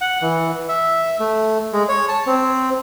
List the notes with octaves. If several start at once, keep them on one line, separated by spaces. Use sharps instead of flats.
F#5
E3
E5
A3
G#3
C#5
A5
C4